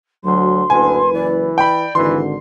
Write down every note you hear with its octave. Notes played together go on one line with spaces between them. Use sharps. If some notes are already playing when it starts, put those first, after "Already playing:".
D2 F#3 C6
F#1 D2 B4 G#5
E3 D5
D5 G5 B5
G#1 D3 E3 C6